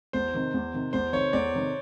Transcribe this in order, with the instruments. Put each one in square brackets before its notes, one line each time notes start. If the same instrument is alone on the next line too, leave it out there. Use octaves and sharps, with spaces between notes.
[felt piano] E2 [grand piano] C5
[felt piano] C3 D#3
E2
C3 D#3
[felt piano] E2 [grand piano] C5
[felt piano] C3 D#3 [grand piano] C#5
[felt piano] E2 [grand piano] D5
[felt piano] C3 D#3